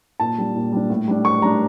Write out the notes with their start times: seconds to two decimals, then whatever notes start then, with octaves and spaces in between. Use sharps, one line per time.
0.20 A#2 A5
0.38 G3 D4
0.56 A#2
0.72 G3 D4
0.90 A2
1.08 G3 D4
1.24 A2 C#6
1.42 G3 A#5
1.45 D4